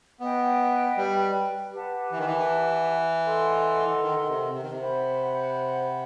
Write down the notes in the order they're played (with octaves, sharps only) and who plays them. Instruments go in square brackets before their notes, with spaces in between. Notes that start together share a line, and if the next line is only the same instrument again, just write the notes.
[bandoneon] B3 [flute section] B4 D#5 G5
[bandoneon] G3
[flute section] G4 B4 F#5 A5
[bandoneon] E3
D#3
E3
[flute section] A4 D#5 F#5 C6
[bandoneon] D#3
D#3
C3
C3
D#3
C3
[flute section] C5 F#5 B5